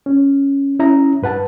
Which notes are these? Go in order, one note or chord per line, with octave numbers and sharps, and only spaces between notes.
C#4
C#4 E4 E5 A#5
G2 B4 F#5 A5